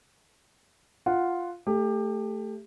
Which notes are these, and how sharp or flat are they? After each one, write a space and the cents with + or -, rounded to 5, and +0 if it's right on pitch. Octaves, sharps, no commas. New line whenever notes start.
F4 +0 F#5 +0
A3 +5 G4 +25